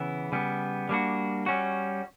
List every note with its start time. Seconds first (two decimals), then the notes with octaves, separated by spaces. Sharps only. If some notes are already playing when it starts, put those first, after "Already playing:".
Already playing: C#3 E3 B3 E4
0.32 C#3 G3 B3
0.89 G3 A#3 D4 F#4
1.46 G3 C#4 F#4